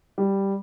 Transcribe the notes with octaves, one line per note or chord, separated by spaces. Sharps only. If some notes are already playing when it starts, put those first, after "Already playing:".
G3